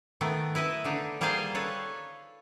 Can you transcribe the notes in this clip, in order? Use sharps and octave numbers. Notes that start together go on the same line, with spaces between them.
D#3 A3 B3
E4 B4 D#5 E5
D3 D4 D#4
G3 A#3 F4 G#4 C5 F5
A4 B4 C#5